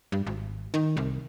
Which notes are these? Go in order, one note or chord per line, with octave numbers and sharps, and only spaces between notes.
G2
G#1
D#3
C2